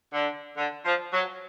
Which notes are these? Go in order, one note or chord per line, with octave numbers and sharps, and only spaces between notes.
D3
D3
F3
F#3